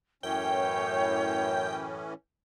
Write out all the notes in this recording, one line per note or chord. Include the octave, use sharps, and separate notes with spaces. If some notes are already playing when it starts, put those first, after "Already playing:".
F#2 A2 E3 C#4 C#5 G5